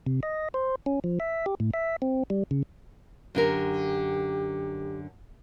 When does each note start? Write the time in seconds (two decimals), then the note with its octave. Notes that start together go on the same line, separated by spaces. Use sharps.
0.06 C3
0.23 D#5
0.54 C5
0.86 C#4
1.04 F3
1.20 E5
1.46 G4
1.60 A2
1.74 E5
2.02 C4
2.30 G3
2.51 C#3
3.35 F#2 D3 G4 A#4